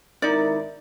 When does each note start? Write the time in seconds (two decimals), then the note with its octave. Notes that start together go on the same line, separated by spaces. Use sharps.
0.22 G#1 D#4 E4 A#4 D5